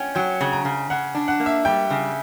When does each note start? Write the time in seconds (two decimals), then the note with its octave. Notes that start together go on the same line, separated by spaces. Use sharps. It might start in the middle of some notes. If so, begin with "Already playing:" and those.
Already playing: C#4 F#5 G5
0.15 F#3 G5
0.41 C#3
0.52 A#5
0.65 C#3
0.90 C#3 F#5
1.15 D4
1.28 F#5
1.40 A#3
1.46 E5
1.65 G3 G5
1.90 C#3